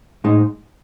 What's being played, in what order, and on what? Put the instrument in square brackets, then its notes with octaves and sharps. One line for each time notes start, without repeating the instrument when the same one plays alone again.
[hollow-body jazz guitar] A2 G#3 D#4